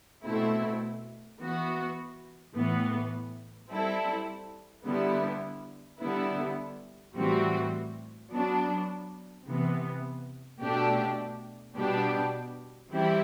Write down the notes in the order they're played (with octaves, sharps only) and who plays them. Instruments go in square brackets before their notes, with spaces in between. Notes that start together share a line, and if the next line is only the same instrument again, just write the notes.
[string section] B2 A3 C4 E4
E3 B3 F#4
A2 E3 B3
G3 C4 E4 A4
D3 G3 B3 E4
D3 G3 B3 E4
A2 E3 G3 C4 F#4
F#3 B3 D4
C3 E3 B3
B2 A3 D4 G4
B2 G3 B3 D4 G4
E3 G3 C4 E4 G4